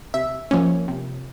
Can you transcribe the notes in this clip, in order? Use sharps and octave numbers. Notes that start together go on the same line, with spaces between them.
C3 E5
F3 A#3 C#4
C3